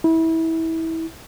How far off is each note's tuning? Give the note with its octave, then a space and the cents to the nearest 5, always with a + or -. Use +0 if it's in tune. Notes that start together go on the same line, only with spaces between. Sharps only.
E4 -25